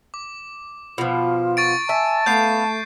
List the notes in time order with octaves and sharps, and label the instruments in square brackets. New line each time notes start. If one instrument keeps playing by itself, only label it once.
[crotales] D6
[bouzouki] B2 F3 [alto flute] F4
[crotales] C#6 A6 D7
[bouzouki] E5 [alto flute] G#5 [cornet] A5
[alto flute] A3 [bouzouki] B3 F5 [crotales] G6 C7